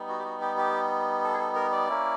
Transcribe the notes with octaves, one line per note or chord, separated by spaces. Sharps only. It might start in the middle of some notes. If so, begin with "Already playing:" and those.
Already playing: G3 B3 D#4
F#4
G4
F#4
G4
G4
A4
G#4
A4
A#4
D5
A#3 C#4 E4